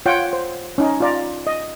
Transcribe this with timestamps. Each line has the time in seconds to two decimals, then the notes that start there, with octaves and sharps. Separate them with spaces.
0.06 F4 C#5 F#5 G5
0.33 C5
0.78 C#4 D#4
1.00 F4 D5 A#5
1.47 D#5